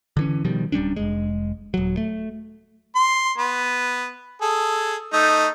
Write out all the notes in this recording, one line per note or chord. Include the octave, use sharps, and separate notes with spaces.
D3 E3 C#4
B2 D#3 F3 G3
D1 G3 C#4 D4
F1 G#3
D#1 F#3
A3
C6
B3
G#4 A4
A3 D#4